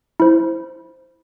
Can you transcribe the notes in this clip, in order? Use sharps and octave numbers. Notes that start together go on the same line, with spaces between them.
E4 C5